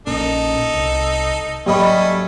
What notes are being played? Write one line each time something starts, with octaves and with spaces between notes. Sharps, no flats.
A#1 A#2 C#4 D#4 A4
C2
G#2 F#3 G3 A3 A#3 C#4 D#5 B5